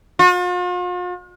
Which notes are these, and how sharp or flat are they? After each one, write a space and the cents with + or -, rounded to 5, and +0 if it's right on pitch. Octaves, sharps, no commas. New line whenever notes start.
F4 +45